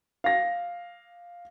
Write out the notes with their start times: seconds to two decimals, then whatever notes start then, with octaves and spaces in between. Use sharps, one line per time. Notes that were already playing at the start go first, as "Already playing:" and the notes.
0.24 F5 A#6